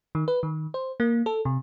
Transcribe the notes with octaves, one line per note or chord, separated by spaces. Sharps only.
D#3
B4
D#3
C5
A#3
A4
C3